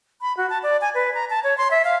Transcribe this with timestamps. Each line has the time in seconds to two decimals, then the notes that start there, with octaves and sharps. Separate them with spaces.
0.22 B5
0.37 F#4
0.50 A5
0.63 D5
0.81 G#5
0.95 B4
1.15 A#5
1.30 A5
1.44 C#5
1.58 C6
1.71 E5
1.85 F5